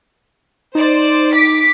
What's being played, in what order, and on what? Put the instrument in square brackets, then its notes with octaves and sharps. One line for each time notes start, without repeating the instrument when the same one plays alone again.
[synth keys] D#4 [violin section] C5 D5
[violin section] D6 B6